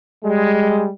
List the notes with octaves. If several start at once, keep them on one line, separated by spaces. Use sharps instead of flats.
G3 G#3